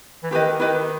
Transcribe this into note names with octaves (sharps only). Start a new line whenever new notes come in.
E3
D#3 E4 G4 B4 D#5
E4 G4 B4 D#5